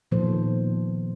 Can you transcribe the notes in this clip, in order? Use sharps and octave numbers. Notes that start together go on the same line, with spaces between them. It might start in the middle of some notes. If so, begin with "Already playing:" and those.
A#2 D#3 F3 B3 A4 C5